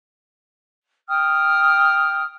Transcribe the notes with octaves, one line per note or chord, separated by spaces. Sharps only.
G5 D#6 F6